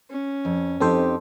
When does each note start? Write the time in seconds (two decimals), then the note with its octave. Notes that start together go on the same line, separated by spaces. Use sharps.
0.10 C#4
0.45 F2
0.80 F2 C4 D#4 G4 A4 C5